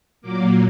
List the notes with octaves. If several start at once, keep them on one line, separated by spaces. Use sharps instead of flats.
A#2 F#3 A#3 D6